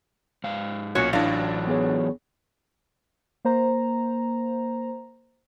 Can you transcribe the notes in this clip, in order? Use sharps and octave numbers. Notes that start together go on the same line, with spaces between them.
G#2 F5
B1 A#2 C#4 F#4 C#5
A1 A2 E3 F#3 D4 D5 F5 A#6
B3 G#4 C#5
A#3 C5 A#5